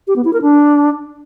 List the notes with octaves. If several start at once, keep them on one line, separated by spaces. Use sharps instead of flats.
G4
B3
E4
A#4
D4